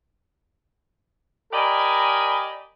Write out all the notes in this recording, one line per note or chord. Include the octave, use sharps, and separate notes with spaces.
G4 A#4 D5 D#5 G#5 B5